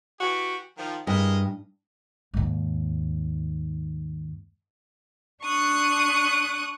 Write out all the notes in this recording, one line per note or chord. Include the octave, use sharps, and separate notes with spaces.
E3 F#4 G4
D#3 F3
G2 G#3 A#4 D#5
D#2 G#2
D4 C#6 D#6 F#6